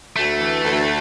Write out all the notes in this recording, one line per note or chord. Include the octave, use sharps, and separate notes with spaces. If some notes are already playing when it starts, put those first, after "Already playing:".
D2 A3
E3
D2